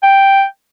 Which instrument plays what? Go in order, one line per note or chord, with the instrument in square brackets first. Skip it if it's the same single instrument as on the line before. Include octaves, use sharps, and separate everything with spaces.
[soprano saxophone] G5